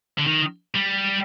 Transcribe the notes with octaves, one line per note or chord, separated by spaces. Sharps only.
D3
D#3
G3